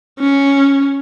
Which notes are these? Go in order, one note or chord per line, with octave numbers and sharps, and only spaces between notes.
C#4